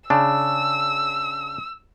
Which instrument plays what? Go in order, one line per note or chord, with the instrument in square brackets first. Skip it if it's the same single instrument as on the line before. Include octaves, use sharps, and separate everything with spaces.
[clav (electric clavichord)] C#3 D4 [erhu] E6